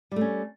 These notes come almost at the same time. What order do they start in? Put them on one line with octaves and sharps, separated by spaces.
G3 A3 C#4